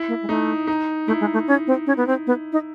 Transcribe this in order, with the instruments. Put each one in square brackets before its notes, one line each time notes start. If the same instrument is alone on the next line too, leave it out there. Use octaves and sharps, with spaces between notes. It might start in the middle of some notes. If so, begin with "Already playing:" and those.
Already playing: [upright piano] E4
[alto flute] A#3
G#3
[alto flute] A3 [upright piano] D#4
[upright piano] D#4
[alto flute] A3 [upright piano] E4
[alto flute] G#3
A3
C#4
C4
C#4
B3
C4
B3
D#4